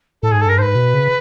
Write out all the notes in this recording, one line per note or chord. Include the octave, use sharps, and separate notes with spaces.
A2 A4
G#2 G#4
A4
G2 A#4
G#2 B4 C5
B2
C#3